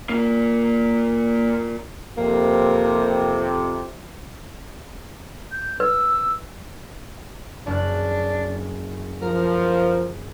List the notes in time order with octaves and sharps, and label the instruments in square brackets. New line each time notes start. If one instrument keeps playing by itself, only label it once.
[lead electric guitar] A#2 A#3
[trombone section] F2 C3 [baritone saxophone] A#3
[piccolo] G6
[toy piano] B4 [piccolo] E6
[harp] F#1 F#6 [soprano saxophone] D4
[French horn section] F3 [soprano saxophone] A#4